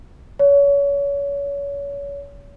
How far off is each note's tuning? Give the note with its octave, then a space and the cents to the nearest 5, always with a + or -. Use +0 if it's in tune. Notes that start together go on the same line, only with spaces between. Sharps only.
C#5 +30